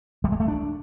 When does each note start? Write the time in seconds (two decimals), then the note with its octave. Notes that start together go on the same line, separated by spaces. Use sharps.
0.24 G3
0.32 G#3
0.40 A3
0.48 D4